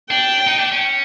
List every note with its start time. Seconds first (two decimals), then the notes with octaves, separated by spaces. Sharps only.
0.10 D4 G5
0.47 D#4
0.59 D4
0.72 C#4